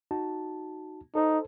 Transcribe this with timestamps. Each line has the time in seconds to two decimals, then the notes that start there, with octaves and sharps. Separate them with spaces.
0.11 D#4 F#4 A5
1.15 D#4 A4 C5